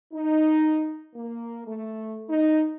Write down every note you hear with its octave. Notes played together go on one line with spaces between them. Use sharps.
D#4
A#3
A3
D#4